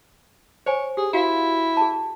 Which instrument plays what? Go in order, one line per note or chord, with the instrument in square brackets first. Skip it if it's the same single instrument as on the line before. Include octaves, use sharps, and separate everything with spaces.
[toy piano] C5 G#5 [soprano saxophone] C#5
[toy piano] G4 [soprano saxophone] G#4
[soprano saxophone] E4 [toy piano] F#4 F5
[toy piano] G#4 A5